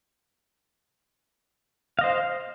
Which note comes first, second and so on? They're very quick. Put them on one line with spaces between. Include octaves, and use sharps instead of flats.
F5 D#5 C5